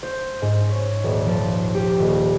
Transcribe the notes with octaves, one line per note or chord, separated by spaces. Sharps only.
C5
G#2
C#5
D#1
F3
G4
D#1